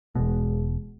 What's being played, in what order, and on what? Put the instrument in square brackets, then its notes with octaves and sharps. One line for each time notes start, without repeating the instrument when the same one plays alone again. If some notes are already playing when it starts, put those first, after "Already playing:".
[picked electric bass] E1 B2 [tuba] G#3